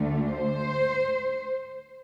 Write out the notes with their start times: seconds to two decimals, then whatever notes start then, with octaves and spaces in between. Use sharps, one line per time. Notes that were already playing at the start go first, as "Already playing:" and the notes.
Already playing: D2 D3 A3
0.29 C5